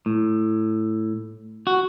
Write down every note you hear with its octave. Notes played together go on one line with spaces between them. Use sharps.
A2
F#4